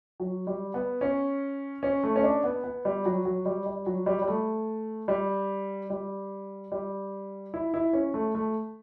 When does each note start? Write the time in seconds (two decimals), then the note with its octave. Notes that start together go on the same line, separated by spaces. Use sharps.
0.20 F#3
0.47 G3
0.74 B3
1.01 C#4
1.83 C#4
2.04 A3
2.16 C#4
2.23 D4
2.44 B3
2.64 B3
2.85 G3
3.06 F#3
3.25 F#3
3.46 G3
3.66 G3
3.86 F#3
4.06 G3
4.22 G3
4.28 A3
5.08 G3
5.90 G3
6.72 G3
7.54 E4
7.74 E4
7.93 C#4
8.14 A3
8.35 A3